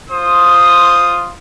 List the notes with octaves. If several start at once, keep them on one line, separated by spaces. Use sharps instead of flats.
F4 C5 D#6